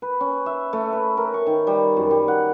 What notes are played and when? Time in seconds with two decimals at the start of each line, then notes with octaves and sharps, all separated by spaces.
0.02 B4
0.21 C#4
0.46 E5
0.73 A3
0.93 B4
1.17 A#4
1.34 C#6
1.47 D#3
1.67 G3
1.97 F#2
2.11 G3
2.28 F#5